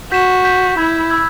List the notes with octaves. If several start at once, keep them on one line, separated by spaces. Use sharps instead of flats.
F#4 G6 B6 E7
G6 B6 E7
E4 B5 E6 G#6
B5 E6 G#6